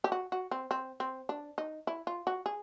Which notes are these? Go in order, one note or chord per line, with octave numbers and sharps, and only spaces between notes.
G4
F#4
F#4
C4
C4
C4
D4
D#4
E4
F4
F#4
G#4